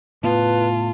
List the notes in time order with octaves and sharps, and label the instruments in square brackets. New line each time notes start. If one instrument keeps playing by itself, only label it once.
[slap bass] A2 B3 [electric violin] F4 [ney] B4 [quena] A5